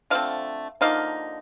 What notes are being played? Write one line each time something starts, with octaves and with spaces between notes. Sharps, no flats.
D3 F3 A3 C4 F5
D3 F3 A#3 D#4 F5